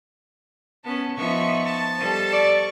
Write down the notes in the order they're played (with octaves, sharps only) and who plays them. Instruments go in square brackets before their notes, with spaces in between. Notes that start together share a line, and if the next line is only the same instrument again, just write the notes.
[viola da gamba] B3 C#4 [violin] A5
[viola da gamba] F3 B3 D#4 [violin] E5 C#6
[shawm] A5
[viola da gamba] G3 A4 [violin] C5
[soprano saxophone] D5 [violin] C#6